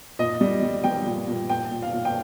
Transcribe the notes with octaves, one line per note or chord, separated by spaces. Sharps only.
A#2 D#5
G3
G3
G3 G5
A#2
A#2
A#2 G5
A#2
F5
A#2
G5